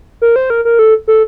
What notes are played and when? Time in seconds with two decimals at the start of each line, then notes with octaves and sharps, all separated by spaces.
0.22 A#4
0.36 C5
0.50 A#4
0.65 A#4
0.79 A4
1.08 A4